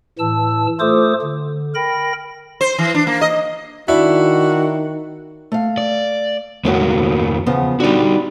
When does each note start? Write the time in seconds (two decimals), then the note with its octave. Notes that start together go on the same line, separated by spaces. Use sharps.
0.19 A2 E3 A5 E6
0.80 A3 F4 A4 C5 D6 D#6
1.22 D3
1.75 A#4 G5 B5 A#6
2.61 C5
2.78 E3
2.95 D4
3.07 A#3
3.21 D#5
3.88 D#3 D4 E4 F#4
5.52 A3 F5
5.78 D5
6.65 E2 G#2 A3 A#3 C#4 F#4
7.46 C#3 F3 B3
7.80 D3 G3 D#4 F#4